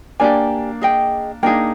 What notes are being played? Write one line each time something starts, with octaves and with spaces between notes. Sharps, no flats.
A#3 D4 G4 D5 G#5
G#4 D#5 G5
A#3 D4 D#4 G#4 D#5 G5